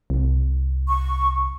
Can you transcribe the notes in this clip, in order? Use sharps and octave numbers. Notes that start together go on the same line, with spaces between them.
C2
C#6